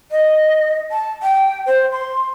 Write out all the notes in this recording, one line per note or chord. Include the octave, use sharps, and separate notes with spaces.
D#5
A5
G5
C5
C6